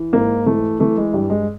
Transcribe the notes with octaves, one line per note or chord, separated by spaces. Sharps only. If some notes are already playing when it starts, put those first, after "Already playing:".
Already playing: E3
G#2 A#3
E3 A3
E3 A3
G#3
G2 G3
G#3